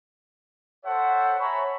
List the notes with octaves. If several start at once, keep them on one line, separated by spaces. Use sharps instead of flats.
A4 C5 C#5 E5 F#5
C#5 E5 G#5 A#5 B5 C#6